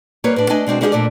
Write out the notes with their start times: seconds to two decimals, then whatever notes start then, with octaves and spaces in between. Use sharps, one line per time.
0.24 G3 A#3 B4 C#5
0.36 A2 D4
0.49 A3 D4 D#5 G#5
0.66 B2 G#3 C4 D4
0.81 G#3 C#4 D4 E4 G4 G#4
0.92 F2 A#2 A3 D4 D5